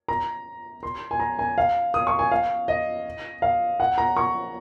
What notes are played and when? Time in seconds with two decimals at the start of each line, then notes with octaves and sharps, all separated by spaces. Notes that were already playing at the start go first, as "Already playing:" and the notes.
0.08 A#5
0.83 C6
1.11 G#5
1.20 A#5
1.39 G#5
1.58 F5
1.94 D#6
2.07 C#6
2.19 G#5
2.32 F5
2.68 D#5
3.42 F5
3.80 F#5
3.98 A#5
4.17 C#6